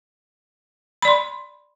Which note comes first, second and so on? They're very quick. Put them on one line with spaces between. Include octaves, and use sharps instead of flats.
B5 D5 C6